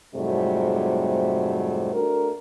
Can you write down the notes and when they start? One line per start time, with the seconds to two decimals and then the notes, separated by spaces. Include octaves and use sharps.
0.15 F2 G#2 C3 F#3 G3 A3
1.93 A3 D4 F#4 A4 A#4